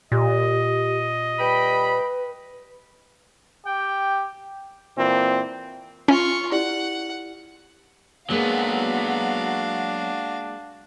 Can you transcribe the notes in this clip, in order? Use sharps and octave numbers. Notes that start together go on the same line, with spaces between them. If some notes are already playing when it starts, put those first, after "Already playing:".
A#2 G4 D#5
G3 B4 G5 B5
G4 G5
A#2 E3 C4
C#4 F4 C#6
E4 G4 D5 F#5
F#3 G#3 A#3 B3 D4 F#4 F5